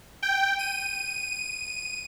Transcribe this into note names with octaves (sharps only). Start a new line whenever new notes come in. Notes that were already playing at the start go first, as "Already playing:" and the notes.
G5
D#7